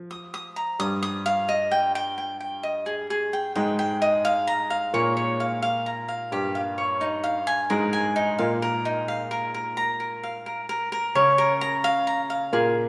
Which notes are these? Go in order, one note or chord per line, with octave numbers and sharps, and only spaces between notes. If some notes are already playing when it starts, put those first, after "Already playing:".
Already playing: F3
D#6
D#6
A#5
G2 G3 D#6
D#6
F5
D#5
G5
G5
G5
G5
D#5
G#4
G#4
G5
G#2 G#3 G5
G5
D#5
F5
A#5
F5
A#2 A#3 C#5
C#5
F5
F5
A#5
F5
G2 G3 G4
F5
C#5
D#4
F5
G#5
G#2 G#3 A#4
G#5
D#4
A#2 A#3 F5
A#4
D#4
F5
A#4
A#4
A#5
A#4
F5
A#4
A#4
A#4
C#3 C#4 C#5
A#4
A#5
F5
A#5
F5
A#2 A#3 G#4